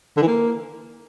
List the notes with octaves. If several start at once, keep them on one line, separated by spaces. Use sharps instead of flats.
D3
E3
A#3